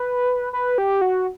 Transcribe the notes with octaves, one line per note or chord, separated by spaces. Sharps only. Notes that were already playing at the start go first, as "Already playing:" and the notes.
Already playing: B4
B4
G4
F#4